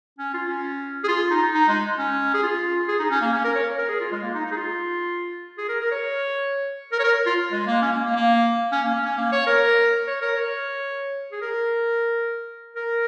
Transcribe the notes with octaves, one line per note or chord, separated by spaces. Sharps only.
C#4
F4
C#4
G#4
F4
D#4
D#4
G#3
C#4
G#4
F4
G#4
D#4
C#4
A#3
C#4
A#4
C#5
A#4
G#4
F4
G#3
A#3
D#4
D#4
G#4
F4
G#4
A#4
A#4
C#5
A#4
C#5
A#4
F4
G#3
A#3
C#4
A#3
A#3
A#3
C#4
A#3
C#4
C#4
A#3
C#5
A#4
C#5
A#4
C#5
G#4
A#4
A#4